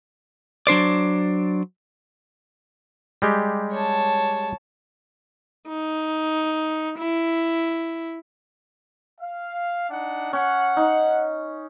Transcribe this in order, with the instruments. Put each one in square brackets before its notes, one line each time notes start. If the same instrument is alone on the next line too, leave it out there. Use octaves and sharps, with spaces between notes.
[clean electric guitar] F#3 D4 C5 D5
[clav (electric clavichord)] G3 G#3 G4
[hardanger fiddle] C#5 A5
[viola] D#4
E4
[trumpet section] F5
D4 D#4 F#5
[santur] C#4 [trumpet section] F#5
[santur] D#4